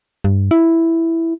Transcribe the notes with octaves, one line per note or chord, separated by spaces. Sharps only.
G2
E4